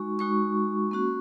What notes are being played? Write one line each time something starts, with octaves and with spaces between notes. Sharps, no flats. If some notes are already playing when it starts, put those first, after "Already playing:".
Already playing: G#3 D#4 F#4 C#6
G#3 D#4 F#4 C#6
A#3 C#4 F#4